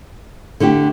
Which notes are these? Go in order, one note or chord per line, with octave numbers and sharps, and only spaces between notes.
D3 A3 E4 G4